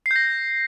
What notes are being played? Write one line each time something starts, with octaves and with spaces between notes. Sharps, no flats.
G6 A#6 C7